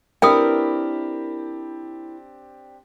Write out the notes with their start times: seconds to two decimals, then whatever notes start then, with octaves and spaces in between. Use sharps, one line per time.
0.22 C4 D4 E4 G4 A#4 B4 G5 D#6